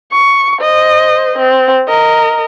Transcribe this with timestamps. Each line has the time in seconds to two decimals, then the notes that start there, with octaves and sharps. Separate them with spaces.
0.12 C#6
0.61 C5 D#5
1.38 C4
1.88 A#4 D#5